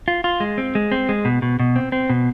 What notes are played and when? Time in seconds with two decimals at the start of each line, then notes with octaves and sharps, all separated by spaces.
0.08 F4
0.24 F4
0.40 G#3
0.58 C4
0.75 G#3
0.92 C4
1.09 G#3
1.25 B2
1.42 B2
1.60 B2
1.76 C4
1.92 C4
2.10 B2